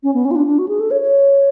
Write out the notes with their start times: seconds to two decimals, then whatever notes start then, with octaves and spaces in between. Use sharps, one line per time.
0.03 C#4
0.14 B3
0.25 C#4
0.31 F4
0.36 D4
0.46 D4
0.59 F#4
0.68 G#4
0.80 A4
0.91 C#5
1.01 C#5